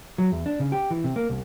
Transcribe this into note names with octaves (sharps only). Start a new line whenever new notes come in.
F#3
E2
D4
C#3
G4
E3
C3
A#3
C2